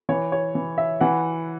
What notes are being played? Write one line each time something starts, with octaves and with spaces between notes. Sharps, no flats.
E3 C#5
C#5
E3
E5
E3 F#5